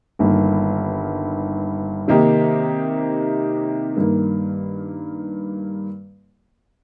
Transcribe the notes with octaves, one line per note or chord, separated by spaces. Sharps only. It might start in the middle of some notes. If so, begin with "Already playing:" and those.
G1 G2 D#3 A#3
C3 D#3 A#3 D#4 G4
G2 D#3 A#3